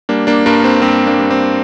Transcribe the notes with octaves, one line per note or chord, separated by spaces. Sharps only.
G3 A#3 D4
A#3 D4
G2 A#3 D4
C4
G2 C4
A#3 D4
G3
C4